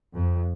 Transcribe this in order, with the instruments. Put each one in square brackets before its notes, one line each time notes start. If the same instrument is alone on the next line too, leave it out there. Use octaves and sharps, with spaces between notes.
[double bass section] F2